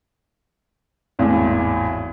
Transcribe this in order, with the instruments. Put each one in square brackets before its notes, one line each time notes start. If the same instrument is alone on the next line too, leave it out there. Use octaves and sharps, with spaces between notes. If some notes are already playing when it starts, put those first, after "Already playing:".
[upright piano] G#1 E2 A2